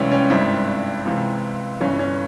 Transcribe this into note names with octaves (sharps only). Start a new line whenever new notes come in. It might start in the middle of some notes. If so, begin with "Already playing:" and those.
Already playing: C#2 C3 E3 G3 C4 C#4 E4
C#4
G#1 G2 G3 C4 E4
C#2 C3 E3
G1 G2 E3 C#4
C#4